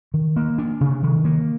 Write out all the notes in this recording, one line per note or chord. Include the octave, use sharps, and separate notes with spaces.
D#3
A#3
D4
C3
D#3
A#3